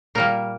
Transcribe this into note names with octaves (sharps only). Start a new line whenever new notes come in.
A#2 G3 A#3 A#4